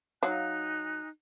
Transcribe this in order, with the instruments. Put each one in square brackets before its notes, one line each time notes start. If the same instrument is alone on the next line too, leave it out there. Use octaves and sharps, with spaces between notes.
[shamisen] F#3 F5 [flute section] D#4 G#5 F#6